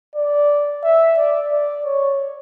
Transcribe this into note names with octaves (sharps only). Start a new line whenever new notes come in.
D5
E5
D5
D5
C#5